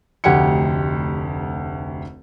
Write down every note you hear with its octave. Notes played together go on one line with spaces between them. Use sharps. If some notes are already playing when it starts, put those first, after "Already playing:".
F1 D2 G4 F#5 G#6 C#7